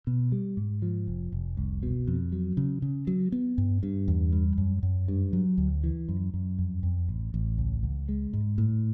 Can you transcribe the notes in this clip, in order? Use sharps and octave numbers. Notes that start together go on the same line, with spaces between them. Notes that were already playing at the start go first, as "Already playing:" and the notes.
B2
G3
G#2
F3
F1
F1
C2
B2
F2
F#3
C#3
C#3
F#3
B3
G2
G2
E2
G3
F#2
F#2
G2
F#3
D2
E3
F#2
F#2
F2
F2
A1
A1
C#2
C#2
G#3
G#2
A2